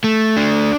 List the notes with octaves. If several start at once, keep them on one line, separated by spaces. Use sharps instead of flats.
A3
D4